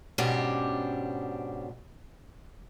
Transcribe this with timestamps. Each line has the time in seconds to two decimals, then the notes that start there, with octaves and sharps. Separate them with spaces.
0.18 G#2 B2 C#4 D4 G4 C5